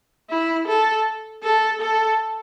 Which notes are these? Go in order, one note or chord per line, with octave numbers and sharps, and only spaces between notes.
E4
A4
A4
A4